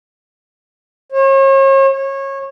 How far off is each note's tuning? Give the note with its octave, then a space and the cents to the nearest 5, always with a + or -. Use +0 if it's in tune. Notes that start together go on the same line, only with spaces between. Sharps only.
C#5 -40
C#5 -25